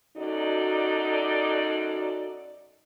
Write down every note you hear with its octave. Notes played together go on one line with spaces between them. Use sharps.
F#2 D#4 F#4 A4 D5